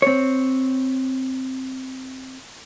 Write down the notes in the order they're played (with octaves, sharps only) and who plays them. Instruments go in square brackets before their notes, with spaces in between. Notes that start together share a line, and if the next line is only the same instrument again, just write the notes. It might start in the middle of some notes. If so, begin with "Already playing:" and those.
[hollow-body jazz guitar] C4 C#5